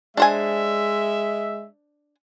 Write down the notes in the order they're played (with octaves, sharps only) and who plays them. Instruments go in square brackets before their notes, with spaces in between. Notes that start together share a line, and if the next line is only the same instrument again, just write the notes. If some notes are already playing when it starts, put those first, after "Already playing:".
[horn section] G#3 E5 [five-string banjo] D4 C5 G#5